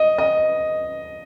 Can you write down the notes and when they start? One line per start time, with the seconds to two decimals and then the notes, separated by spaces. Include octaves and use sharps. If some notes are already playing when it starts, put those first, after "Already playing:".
Already playing: D#5
0.18 D#5